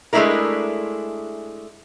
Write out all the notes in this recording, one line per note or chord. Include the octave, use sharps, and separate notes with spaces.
G#3 A3 B3 D4 E4 A#4